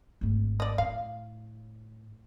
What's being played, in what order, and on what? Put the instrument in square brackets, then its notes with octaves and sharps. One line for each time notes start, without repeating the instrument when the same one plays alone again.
[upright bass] G#1 A3
[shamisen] D5 D#5
[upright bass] A2 [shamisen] F5